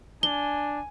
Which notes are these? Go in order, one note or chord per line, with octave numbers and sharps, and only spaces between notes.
D4 G#5 G7